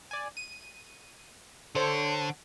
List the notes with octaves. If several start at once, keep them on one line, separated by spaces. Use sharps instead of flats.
D5 G#5
D#7
D3 A4 C5 C#5